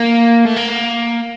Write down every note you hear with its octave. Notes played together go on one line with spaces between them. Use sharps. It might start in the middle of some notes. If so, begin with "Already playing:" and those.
Already playing: A#3
A3
A#3